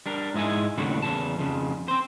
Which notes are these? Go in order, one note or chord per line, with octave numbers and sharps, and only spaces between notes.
G3 D4 A#4
G#2 G#3 E4 D#5 G#5
D#2 A2 C#3 G3 D4 F#4
E2 C#3 A5
F2 C#3
C4 C5